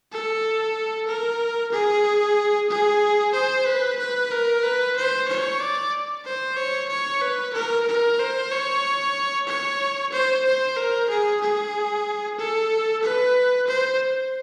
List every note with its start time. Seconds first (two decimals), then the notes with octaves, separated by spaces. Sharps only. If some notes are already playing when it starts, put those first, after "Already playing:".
0.12 A4
1.08 A#4
1.73 G#4
2.70 G#4
3.34 C5
3.66 B4
3.99 B4
4.31 A#4
4.63 B4
4.96 C5
5.28 C#5
5.60 D5
6.25 C5
6.57 C#5
6.89 C#5
7.21 B4
7.53 A#4
7.87 A#4
8.19 C5
8.51 C#5
9.47 C#5
10.12 C5
10.45 C5
10.76 A#4
11.10 G#4
11.41 G#4
12.38 A4
13.03 B4
13.67 C5